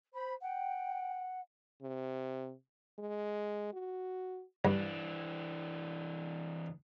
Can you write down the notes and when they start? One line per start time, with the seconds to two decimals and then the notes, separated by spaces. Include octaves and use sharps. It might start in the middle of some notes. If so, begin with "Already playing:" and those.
0.14 C5 B5
0.41 F#5 G5
1.82 C3
2.99 G#3
3.73 F#4
4.65 G2 E3 D4